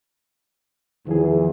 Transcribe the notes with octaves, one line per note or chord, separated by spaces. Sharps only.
E2 D#3 F3 G#4